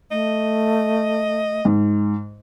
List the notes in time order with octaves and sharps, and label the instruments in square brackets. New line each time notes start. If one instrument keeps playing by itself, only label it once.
[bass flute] A3 [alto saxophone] D#5
[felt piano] G#2